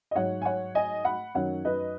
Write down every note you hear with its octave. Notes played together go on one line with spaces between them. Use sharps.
D#5
G#2 F#3 C#5 F#5
G#5
C#5 F#5
D#5 G#5
F#5 B5
F#2 D#3 F#3 C#5 F#5
B4 D#5